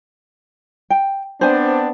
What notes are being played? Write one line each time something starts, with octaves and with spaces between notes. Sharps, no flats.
G5
B3 C4 D4 C5 G#5